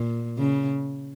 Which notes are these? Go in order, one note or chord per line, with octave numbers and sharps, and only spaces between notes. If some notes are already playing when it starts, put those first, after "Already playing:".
Already playing: A#2
C#3